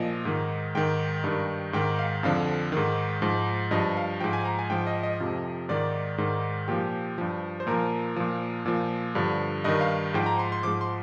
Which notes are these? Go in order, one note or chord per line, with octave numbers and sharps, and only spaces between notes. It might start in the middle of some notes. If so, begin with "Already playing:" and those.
Already playing: A#2 F3 D#5
G#2 D#3
G#2 D#3 G5
G2 D#3
G#2 D#3 G5
F5
F2 D3 F3 F5
G#2 D#3
G#2 F3
G2 F3 D#5
F5
G#2 F3 G5
G#5
A#5
G#5
G#2 F3 G5
D#5
D#5
F2 C3 F3
G#2 D#3 D5
G#2 D#3
A#2 F3 G4
G2 F3
C5
A#2 F3 A#4
A#2 F3
A#2 F3
G2 D3 F3
G2 D#3 D#5
F5
G#2 F3 G5
A#5
C6
C6
G#2 F3 D6
C6